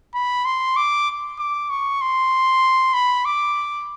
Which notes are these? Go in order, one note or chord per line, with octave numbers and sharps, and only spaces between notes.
B5
C6
D6
D6
C#6
C6
B5
D6